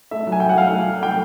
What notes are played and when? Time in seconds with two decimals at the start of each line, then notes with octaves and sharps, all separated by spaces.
0.11 A3 E5
0.27 F#3
0.32 G#5
0.40 F#3 G5
0.49 F#5
0.57 A3 F5
0.72 A3
0.87 F#3
1.03 A3 G5